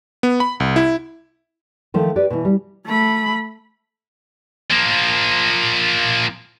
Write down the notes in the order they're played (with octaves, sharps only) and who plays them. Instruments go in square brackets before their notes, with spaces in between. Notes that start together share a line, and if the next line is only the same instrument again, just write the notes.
[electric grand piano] B3
B5
C2
E4
[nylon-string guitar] D#3 F3 A3
G4 B4 D5
B2 E3
G3
[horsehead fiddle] A3 B5
[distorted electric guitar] F3 A#3